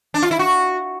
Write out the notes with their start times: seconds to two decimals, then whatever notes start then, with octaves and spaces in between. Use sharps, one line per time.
0.14 D4
0.23 F4
0.31 E4
0.39 F#4